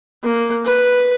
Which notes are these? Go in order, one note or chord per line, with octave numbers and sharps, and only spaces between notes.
A#3
B4